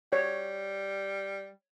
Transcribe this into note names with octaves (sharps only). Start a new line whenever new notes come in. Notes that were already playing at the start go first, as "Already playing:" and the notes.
G3 C#5